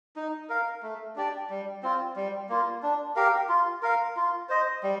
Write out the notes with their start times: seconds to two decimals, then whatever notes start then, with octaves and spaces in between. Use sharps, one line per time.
0.16 D#4
0.49 A#4 F5
0.83 A3
1.16 D4 G4 D5
1.50 G3
1.83 C4 F4
2.16 G3
2.49 A#3 F4
2.83 D4
3.16 G4 A#4 F5
3.49 F4
3.83 A#4 F5
4.17 F4
4.49 C5 D#5
4.83 G3